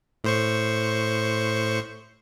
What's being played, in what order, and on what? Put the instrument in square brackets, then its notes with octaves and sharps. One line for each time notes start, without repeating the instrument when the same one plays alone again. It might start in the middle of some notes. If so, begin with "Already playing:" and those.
[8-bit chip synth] A2 C5 C#6